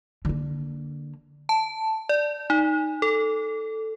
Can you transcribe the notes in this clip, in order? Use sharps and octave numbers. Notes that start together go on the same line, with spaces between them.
D3 A#3
A5
D5
D#4
A4